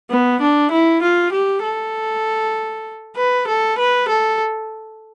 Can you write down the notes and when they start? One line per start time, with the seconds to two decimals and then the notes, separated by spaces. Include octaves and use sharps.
0.10 B3
0.41 D4
0.71 E4
1.02 F4
1.32 G4
1.64 A4
3.17 B4
3.47 A4
3.78 B4
4.08 A4